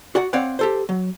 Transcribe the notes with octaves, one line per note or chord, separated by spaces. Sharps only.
F#4 D5 F#5
C4 C#5 D5 F5 F#5
G4 A4 C5
F#3